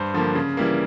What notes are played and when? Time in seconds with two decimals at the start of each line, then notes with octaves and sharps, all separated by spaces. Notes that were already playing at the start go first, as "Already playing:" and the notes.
Already playing: G2 C5
0.14 D3 F3 A#3
0.35 C#3
0.57 E3 G3 A#3